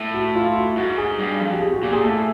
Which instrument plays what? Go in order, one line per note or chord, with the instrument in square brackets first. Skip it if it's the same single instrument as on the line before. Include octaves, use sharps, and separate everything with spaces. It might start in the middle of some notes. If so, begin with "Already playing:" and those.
Already playing: [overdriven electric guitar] A2
[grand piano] F#4
F4
F#4
[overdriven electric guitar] G#2 [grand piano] F#4
[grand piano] G#4
[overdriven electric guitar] G2
F2
[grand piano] G4
G#4
F#4
[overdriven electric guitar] A#2 [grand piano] G4
[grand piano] G#4
[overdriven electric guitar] A2 [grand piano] A4